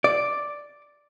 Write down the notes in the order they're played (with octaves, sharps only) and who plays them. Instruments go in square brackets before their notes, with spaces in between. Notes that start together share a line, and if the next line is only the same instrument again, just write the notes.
[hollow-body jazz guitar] D5